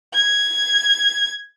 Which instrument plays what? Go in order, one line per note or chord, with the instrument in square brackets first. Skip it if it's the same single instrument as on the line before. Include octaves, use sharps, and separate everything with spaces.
[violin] G#6